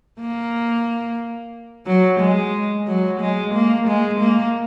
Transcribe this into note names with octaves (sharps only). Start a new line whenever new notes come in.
A#3
F#3
G#3
F#3
G#3
A#3
G#3
A#3